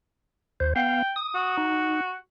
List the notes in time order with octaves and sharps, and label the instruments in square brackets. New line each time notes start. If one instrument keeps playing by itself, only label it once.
[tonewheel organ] D#2 C5
[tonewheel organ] B3 F5 [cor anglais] G5
[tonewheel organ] D#6
[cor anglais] F#4
[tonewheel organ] D#4